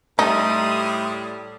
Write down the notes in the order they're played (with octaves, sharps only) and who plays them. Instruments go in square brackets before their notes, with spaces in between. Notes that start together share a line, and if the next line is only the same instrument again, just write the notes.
[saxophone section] A2 G3 [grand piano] A3 [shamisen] D#4 [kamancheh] C6 D#6